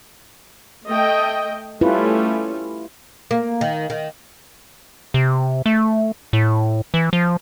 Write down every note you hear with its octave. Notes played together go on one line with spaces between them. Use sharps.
A3 D#5 G5
G3 A3 C#4 E4 F4 B4
A#3
D#3
D#3
C3
A3
A2
E3
F3